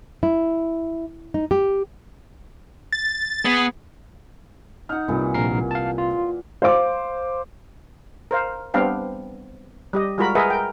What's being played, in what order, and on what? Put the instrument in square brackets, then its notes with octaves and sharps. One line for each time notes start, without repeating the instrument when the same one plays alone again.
[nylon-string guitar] E4
D#4
G4
[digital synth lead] A6
[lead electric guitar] B3 [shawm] G#4
[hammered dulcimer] D#4 F#5 [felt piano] F6
[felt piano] C2 [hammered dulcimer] A#2 E3
[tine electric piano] A#1 A#4 C7
F5 A5
F4
[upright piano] C5 F5 D6
[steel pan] A#4 C5 F5
G3 B3 C4 D4 F5 G5
G3 G4 D#5
G3 G#3 F4 F#4 A#4 B5
G#4 A#4 B4 D#5 E5 F#5
A#4 G5